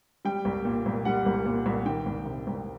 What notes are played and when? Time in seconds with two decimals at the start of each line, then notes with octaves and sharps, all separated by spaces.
0.25 G3 G5
0.45 C2
0.65 A#2
0.86 C2
1.05 G3 F#5
1.26 C2
1.46 A#2
1.66 C2
1.86 D#3 G5
2.06 C2
2.26 C3
2.47 C2